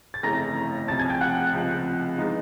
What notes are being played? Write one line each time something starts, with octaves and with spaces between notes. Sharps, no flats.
A6
G1 F2 C#3 E3 A3 A#5 A#6
C2 C3 F3 A5 A6
G#5 G#6
G5 G6
F#5 F#6
C#2 C3 F3
E3 G#3 B3 D#4